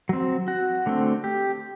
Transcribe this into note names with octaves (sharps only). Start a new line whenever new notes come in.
F#3 C4
F#4
D3 A3 C4
G4